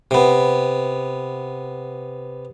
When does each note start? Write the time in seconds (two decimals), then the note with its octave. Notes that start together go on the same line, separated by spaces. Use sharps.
0.11 C3 B3